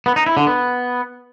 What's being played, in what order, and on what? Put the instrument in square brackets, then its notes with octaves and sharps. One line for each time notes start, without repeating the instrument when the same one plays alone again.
[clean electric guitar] B3
D#4
E4
D3
B3